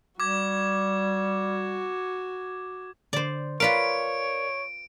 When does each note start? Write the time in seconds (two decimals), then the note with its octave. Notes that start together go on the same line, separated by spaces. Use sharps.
0.20 G3 F#4 D6 G#6
3.13 D3 C5 D5
3.60 F4 A#4 B4 C#5 D5 F5 D7